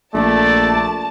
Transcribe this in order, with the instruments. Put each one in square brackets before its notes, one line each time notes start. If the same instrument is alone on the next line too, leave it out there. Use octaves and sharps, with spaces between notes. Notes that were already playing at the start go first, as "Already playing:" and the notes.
[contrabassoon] A#1 [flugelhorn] A3 [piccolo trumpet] D5 [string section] A5